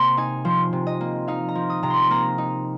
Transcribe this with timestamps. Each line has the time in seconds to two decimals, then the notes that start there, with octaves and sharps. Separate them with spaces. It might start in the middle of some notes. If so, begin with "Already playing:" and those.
Already playing: C3 A#3 C6
0.17 D#4 G#5
0.45 F3 C5
0.73 C3
0.87 D#5
1.01 A#3
1.28 D#4 F5
1.48 A#5
1.55 F3
1.70 D#6
1.83 C3 A#5
1.90 C6
2.10 A#3 A#5
2.38 D#4